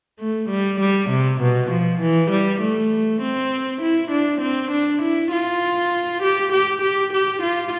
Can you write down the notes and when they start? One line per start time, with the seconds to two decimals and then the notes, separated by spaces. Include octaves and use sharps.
0.20 A3
0.50 G3
0.80 G3
1.10 C3
1.41 B2
1.71 F3
2.00 E3
2.31 G3
2.61 A3
3.22 C4
3.82 E4
4.11 D4
4.41 C4
4.71 D4
5.02 E4
5.32 F4
6.23 G4
6.53 G4
6.82 G4
7.13 G4
7.43 F4